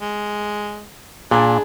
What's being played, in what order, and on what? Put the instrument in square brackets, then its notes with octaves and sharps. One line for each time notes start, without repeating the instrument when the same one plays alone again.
[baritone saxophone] G#3
[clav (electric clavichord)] A#2 [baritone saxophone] D4 [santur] G#4 B5